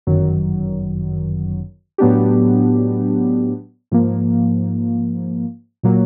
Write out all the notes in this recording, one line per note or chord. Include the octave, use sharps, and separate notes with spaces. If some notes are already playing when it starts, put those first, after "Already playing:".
G1 F#2 D#3 F#3
A2 F#3 B3 D4 G4
G#2 F3 A#3
A#2 F#3 A#3